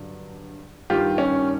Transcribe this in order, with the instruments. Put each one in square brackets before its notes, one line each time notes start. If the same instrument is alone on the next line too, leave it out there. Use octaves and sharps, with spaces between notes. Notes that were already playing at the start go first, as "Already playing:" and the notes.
Already playing: [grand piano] G2 D3 F#3
G2 D#3 G3 F4 G4
C#4